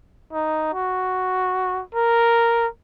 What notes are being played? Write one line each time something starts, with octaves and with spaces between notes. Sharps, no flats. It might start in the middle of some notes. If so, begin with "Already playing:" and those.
D#4
F#4
A#4